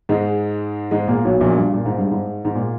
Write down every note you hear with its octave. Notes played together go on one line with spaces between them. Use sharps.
G#2 G#3
G#2 G#3
A#2 A#3
B1 B2
A#1 A#2
G2
A#2
G#2
G2
G#2
G#2
A#2